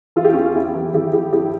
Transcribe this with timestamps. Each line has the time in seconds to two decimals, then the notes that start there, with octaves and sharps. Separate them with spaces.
0.16 E3 F4
0.25 G4
0.33 E2 C#4 F4
0.55 E2 E4 G4
0.75 E3
0.93 G#1 E4 G4
1.13 F3 E4 G4
1.33 G2 E4 G4